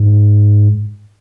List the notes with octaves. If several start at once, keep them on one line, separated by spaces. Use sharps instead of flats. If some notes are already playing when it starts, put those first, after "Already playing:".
Already playing: G#2